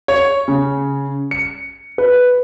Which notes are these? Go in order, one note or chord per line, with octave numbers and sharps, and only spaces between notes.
C#5
C#3
C#7
B4